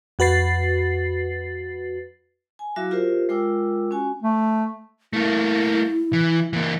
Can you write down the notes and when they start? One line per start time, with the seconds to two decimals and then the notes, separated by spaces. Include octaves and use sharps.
0.19 F2 F#4 B4 A6 C7
2.59 G#5
2.76 F#3 E4 F#4 E5 F5 D6
2.91 F4 G4 A#4 C5 E5
3.29 G#3 F4 A#4 G5 D6 E6
3.91 C#4 F#4 G#5
4.22 A3
5.13 A3 A#3 E4
6.13 E3
6.53 E3 A#3